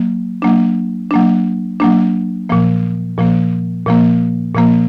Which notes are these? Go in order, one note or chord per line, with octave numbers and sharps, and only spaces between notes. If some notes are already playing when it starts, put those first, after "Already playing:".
Already playing: F#3 A#3
F#3 A#3 D4
F#3 A#3 D4
F#3 A#3 D4
A#2 F3 A#3
A#2 F3 A#3
A#2 F3 A#3
A#2 F3 A#3